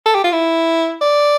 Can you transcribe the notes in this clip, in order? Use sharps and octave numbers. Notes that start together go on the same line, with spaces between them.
A4
G4
F4
E4
D5